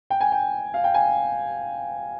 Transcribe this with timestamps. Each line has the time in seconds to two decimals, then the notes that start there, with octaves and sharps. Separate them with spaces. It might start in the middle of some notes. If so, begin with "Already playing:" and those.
0.10 G5
0.21 G#5
0.32 G5
0.74 F5
0.84 G5
0.94 G#5